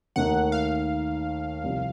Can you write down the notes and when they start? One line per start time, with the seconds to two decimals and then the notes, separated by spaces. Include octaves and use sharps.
0.16 D#2 D#3 A3 D#4 A#4 F#5
0.52 F5
1.63 C2 C3 F3